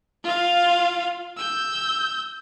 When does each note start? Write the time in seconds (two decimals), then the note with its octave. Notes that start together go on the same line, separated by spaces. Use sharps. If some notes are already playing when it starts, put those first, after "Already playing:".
0.24 F4 F5
1.37 E6 G6